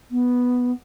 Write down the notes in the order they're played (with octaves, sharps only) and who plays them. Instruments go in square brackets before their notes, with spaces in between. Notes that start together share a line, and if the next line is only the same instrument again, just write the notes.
[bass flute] B3